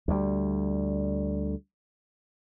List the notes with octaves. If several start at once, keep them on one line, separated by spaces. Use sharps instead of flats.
D2 G3